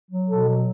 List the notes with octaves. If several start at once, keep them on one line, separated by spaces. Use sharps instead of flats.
F#3
B2 A4
F#3